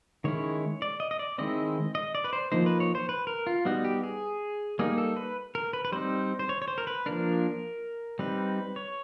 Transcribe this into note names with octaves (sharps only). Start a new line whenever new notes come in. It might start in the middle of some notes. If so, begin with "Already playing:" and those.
D#3 G#3 C#4 E4 C#5
D5
D#5
D#5
D5
D#3 G#3 C4 E4 D#5
D#5
D5
B4
C5
F3 A#3 D#4 C5
B4
C#5
C5
B4
A#4
F4
G3 B3 D#4 F#4
G4
G#4
G3 A#3 D#4 G#4
A4
B4
A#4
B4
B4
G3 C4 D#4 C5
C5
C#5
C#5
C5
A#4
B4
F3 A#3 D4 A#4
G3 C4 D#4 B4
C#5